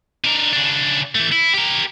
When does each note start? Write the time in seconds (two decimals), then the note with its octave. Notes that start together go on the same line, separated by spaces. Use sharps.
0.24 D3 A#4
0.53 C#3 D4
1.15 E3 A3
1.32 E4
1.54 G4 A#4